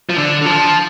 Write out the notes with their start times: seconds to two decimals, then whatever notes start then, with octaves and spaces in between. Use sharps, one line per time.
0.09 F3
0.17 D3
0.42 D3
0.46 F3